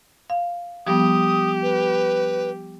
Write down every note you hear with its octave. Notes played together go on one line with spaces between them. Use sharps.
F5
F3 G3 B3 G4 D#6
B4